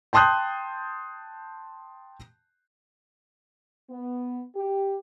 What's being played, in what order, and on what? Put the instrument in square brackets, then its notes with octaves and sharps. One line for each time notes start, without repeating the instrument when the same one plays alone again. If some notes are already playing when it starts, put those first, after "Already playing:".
[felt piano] G5 A5 C6 D#6 F#6 G6
[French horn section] B3
G4